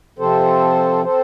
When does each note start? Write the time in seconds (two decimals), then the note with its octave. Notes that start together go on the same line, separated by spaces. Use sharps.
0.19 C3 F3 C4 A4 C5
1.04 C4 A4 C5